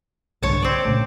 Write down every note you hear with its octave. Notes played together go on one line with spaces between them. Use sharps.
C2 G#2 D3 C#5 A5
C4 D5
A#2 C#3 A3